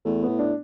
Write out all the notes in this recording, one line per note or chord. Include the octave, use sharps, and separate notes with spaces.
E2 A3
B3
A2
D4